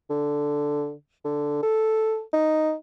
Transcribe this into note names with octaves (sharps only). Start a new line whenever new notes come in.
D3
D3
A4
D#4